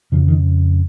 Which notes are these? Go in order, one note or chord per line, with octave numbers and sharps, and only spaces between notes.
F2 C#3 F3
D#3